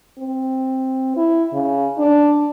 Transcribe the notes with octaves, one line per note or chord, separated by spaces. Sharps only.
C4
E4
C#3
D4